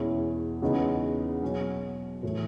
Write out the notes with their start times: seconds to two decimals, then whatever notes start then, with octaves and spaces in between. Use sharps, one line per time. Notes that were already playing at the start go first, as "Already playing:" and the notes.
Already playing: E2 B2 G#3 C#4 E4
0.62 E2 C#3 G#3 B3 D#4
1.43 B2 F#3 C#4 F#4
2.23 A2 E3 A3